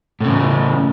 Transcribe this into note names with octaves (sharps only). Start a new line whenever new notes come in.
A2 C#3